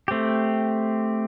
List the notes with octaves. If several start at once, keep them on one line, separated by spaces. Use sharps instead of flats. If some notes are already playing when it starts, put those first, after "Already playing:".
A3 C4 G4